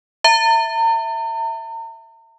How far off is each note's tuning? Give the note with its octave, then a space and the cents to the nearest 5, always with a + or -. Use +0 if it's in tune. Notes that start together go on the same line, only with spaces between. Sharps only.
E5 +0 A#5 -40